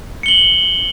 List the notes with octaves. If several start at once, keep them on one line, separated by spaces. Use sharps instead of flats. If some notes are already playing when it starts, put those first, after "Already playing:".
C#7 F#7 G7